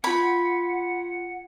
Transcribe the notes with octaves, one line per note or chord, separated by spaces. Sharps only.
F4 F#5 B5 G#6